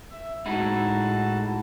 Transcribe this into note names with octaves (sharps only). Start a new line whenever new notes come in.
E5
A2 G#3 D#4 E4 F#4 A5